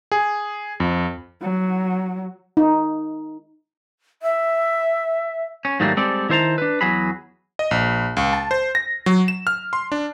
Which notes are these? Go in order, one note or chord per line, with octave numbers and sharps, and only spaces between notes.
G#4
F2
F#3
D#4
E5
C#4
G#2 D#3 F#3 G3 A3 A#3
G3 G#3 C4 A4 D5
D#3 E4 C5 A5 A#5
D4 B4
E2 F#3 F#4 G#4 B5
D#5
A#1
C#2
A5
C5
A#6
F#3
E7
F6
C6
D4